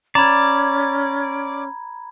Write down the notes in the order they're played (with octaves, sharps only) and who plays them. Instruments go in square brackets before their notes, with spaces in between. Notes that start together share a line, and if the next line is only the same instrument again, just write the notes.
[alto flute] C#4 [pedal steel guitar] D5 [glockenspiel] A#5 B5 G#6